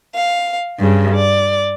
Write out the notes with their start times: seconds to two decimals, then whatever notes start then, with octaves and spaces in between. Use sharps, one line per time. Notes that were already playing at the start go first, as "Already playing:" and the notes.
0.16 F5
0.79 G2 C#3
1.13 D5